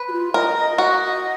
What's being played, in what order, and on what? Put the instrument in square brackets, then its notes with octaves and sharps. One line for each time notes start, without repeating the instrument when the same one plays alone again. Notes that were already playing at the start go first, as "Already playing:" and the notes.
Already playing: [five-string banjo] B4
[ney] F#4
F4
[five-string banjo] A#4 [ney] D#5
[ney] D#5
[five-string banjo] F#4